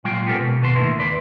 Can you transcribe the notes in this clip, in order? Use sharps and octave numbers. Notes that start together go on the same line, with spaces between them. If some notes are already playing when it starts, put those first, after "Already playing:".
A#2 F#3 G#3 F4 G5
B3 C#4 G4 A4 A#4 C5
B2
D#2 B2 B4 A5 C6
A2 D3 D#3 A#3 E4
D#2 B4 D5 C6